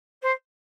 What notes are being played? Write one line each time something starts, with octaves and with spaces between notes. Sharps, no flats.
C5